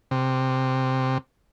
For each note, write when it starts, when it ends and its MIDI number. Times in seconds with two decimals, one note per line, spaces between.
0.11 1.18 48